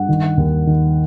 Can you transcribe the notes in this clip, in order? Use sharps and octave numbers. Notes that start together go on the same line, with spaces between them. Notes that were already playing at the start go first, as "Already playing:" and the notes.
Already playing: G2 F#5
D#3
D#2
D#3